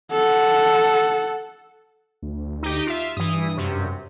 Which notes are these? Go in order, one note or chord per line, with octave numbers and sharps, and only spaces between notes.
A4 F#5
D2
D#4 G4
F4 E5
G2 E3 D#6
F#2 C3